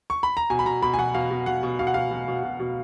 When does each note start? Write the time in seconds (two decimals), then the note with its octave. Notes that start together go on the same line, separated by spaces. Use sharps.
0.10 C#6
0.23 B5
0.37 A#5
0.50 B2 G#5
0.59 B5
0.66 B2 A#5
0.82 B2 B5
0.94 G#5
0.98 B2 F#5
1.14 B2 F5
1.31 B2
1.46 B2 F#5
1.63 B2
1.79 B2 F5
1.87 F#5
1.94 B2 F5
2.11 B2
2.28 B2
2.44 B2
2.60 B2